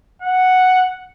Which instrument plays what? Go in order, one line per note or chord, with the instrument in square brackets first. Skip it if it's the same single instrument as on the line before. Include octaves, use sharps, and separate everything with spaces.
[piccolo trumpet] F#5